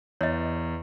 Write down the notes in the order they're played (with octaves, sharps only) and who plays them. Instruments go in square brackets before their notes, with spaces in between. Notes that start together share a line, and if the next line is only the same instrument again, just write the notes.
[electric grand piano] E2 [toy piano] C#5 D#5